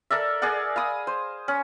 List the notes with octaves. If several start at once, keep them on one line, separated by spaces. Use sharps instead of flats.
A4 A#4 D5 E5
G#4 A#4 D5 F#5
F5 B5 D#6
C5
C#4